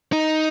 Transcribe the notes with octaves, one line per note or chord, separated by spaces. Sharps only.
D#4